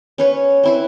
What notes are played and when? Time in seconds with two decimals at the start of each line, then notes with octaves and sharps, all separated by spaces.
0.18 C#4 B4 C#5
0.64 C4 E4 B4